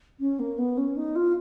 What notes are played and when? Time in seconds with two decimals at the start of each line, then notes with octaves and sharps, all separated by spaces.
0.20 C#4
0.39 A#3
0.58 B3
0.77 C#4
0.96 D#4
1.15 F4